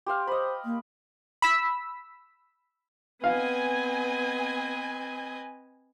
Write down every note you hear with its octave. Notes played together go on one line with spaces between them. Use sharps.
G4 C5 F5
C5 D#5 B5
A#3
B5 E6 B6
B3 C4 B4 D#5 F5 G#5